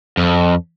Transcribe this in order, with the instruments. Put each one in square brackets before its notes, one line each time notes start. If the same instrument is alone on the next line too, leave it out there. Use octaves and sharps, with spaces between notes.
[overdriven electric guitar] F2